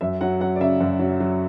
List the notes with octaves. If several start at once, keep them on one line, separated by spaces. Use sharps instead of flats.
F#2 E5
F#3 F#5
F#3 F#5
D5
C#3 E5
F#2
F#3
F#3